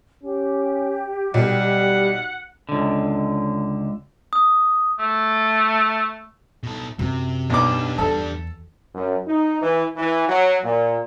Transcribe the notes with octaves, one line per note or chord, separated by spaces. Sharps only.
C#4 G4
B1 G3 F#5
C#2 D3
D#6
A3
B2 A4
F#2 C3
B1 B2 G3 D4 D6
E2 A4
F#2
D#4
E3
E3
F#3
A#2